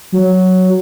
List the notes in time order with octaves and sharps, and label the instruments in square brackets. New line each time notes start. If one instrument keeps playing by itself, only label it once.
[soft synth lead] F#3